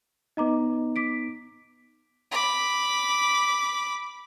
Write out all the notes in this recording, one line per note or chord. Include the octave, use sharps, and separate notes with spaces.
B3 D#4 D#5 A#5 D6
D6 B6 D7
B5 D6